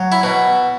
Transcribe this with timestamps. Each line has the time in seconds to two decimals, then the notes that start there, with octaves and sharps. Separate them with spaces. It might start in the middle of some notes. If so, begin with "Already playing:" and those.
Already playing: F#3
0.12 E4
0.23 B2